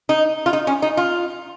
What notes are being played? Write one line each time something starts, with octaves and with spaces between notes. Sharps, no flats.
D#4
F4
D#4
C#4
D#4
F4